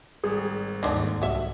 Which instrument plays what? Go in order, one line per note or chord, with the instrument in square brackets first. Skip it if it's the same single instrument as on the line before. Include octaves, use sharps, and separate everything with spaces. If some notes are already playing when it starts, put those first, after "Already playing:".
[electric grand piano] G#1 G3 [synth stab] G#4
[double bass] D#2 G#2 [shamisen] D3 D#3 D4
[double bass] C2 [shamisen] F#3 E5 [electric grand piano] F#5